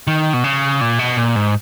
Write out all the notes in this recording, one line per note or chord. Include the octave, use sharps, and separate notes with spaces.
D#3
B2
C#3
A#2
B2
A#2
G#2